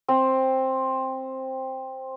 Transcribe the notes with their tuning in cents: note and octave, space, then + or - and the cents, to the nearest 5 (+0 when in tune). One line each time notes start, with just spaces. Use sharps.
C4 +10